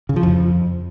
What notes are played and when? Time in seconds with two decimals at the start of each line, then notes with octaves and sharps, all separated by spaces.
0.09 C#3
0.16 F3
0.23 F2